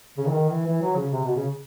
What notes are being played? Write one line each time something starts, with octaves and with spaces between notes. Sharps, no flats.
C#3
E3
D#3
E3
E3
F#3
C#3
C3
B2
C#3